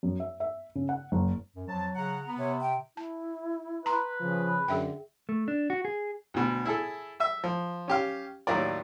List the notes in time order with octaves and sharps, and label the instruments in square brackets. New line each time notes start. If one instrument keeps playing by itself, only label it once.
[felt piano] F#2
E5
E5
C#3
F#5
F#1
[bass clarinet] F#2
[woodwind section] F2 F3 A5 [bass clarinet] F#3
[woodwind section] C#3 F#5 [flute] A#5
[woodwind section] B3
[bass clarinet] C3 [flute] C#5
[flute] G5
[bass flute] E4 [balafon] A5
[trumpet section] B4 [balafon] A#5 C6
[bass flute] C#3 [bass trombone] F3
[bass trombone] F#2 [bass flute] D3 [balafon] G#4 E5 G5
[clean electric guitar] A3
D4
F#4
G#4
[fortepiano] D2 B2
E4 G#4 A4
E5 E6
F3
C#4 G4 F5
D#2 A2 F#3 F4 A#4 D5